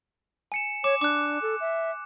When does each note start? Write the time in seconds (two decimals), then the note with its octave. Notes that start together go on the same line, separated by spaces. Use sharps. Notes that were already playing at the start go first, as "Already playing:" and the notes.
0.52 G#5 C#7 E7
0.84 C#5 D6 E7
1.01 D4 D6 F#6
1.42 A4
1.61 E5